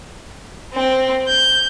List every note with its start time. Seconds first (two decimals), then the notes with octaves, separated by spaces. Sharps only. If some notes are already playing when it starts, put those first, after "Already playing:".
0.75 C4
1.28 G6